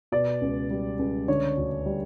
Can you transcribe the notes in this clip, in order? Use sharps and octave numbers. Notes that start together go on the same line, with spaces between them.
B2 D5
C#2
G3
C#2
D3 C#5
D2
G3